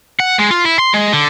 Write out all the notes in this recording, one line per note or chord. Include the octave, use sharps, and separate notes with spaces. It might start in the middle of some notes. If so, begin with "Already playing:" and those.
F#5
G#3
F4
E4
C6
G#3
D3